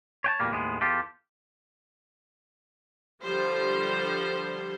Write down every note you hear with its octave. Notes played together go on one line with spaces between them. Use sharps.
C#5 G5 A5
E2 A#2 G3 A#3
D#2 A2 G#3 B3
E2 F4 G4 A4
D3 F3 G3 C5